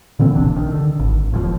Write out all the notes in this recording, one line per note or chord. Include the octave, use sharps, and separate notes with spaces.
A#2 D3 E3 C4
D1 A#1 C3 D4
D#3
D3
G#1
E1 D#2 C#3 F3